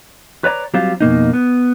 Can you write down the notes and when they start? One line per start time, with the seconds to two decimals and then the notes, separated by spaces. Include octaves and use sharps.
0.44 B4 C#5 D5 A#5
0.74 F#3 G3 C4 F4
1.01 F2 B2 A#3 D#4
1.33 B3